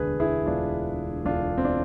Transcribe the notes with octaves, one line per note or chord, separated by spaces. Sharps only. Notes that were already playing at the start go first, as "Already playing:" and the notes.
Already playing: E1 D2 D3 G#4 B4
E4 G#4
E1 D2 D3 D4 F4
E1 D2 D3 D4 F4
C4
D4